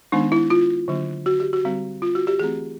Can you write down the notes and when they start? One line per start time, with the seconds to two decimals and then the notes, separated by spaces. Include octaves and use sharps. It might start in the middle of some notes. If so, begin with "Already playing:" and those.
0.12 D#3 G#3 B3 D4 D#4
0.32 E4
0.50 F4
0.88 D3 F#3 A#3 D4
1.26 F#4
1.40 G4
1.53 F#4
1.64 D3 G3 C4
2.02 F4
2.15 F#4
2.27 G4
2.39 E3 A3 C4 G#4